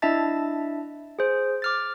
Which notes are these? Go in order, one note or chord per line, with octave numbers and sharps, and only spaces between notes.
D4 E4 D#5 E5 A5 A6
G#4 C5
D6 F6 A6